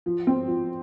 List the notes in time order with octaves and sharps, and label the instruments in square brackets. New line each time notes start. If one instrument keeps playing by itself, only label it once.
[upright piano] F3
C4
F3